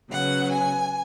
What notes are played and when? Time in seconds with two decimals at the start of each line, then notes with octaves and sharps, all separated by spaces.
0.10 C#3 F#3 B3 F#5
0.53 G#5